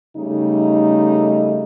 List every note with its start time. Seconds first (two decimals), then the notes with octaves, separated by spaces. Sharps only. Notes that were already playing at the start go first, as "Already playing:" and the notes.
0.17 C#3 G3 A3 D#4